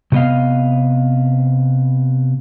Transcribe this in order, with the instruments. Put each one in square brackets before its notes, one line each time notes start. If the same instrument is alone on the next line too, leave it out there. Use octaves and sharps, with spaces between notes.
[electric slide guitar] C3 A3 B3 D#5 F5